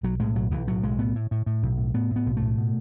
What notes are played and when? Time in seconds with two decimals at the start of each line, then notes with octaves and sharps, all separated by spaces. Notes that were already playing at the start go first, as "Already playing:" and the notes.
0.03 B1 F#3
0.20 A2 G#3
0.35 B1 F#3
0.51 B1 E3
0.67 A2 F#3
0.83 B1 G#3
0.98 A2 B3
1.15 A2
1.31 A2
1.46 A2
1.63 B1
1.78 A2
1.94 A2 B3
2.11 A2
2.16 B3
2.26 B1
2.37 A2 A3
2.58 B2